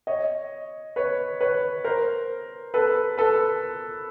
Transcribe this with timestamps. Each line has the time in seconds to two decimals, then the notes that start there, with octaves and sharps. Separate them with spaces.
0.07 C#5 D#5
0.96 B4 C#5
1.41 B4 C#5
1.84 A#4 C5
2.74 A4 B4
3.18 A4 B4